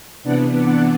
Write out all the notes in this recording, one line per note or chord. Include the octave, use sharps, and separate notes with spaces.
C3 E3 B3 D4 D5 F#5
D5 F#5